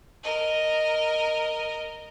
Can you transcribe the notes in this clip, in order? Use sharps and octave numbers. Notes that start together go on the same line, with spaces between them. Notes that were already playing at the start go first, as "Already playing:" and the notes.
A#4 D#5